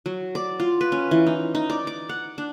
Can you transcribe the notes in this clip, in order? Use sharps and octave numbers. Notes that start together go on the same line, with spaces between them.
F#3
D5
F4
B4
C#4
E3
D#4
D#4
D5
D6
F#5
D4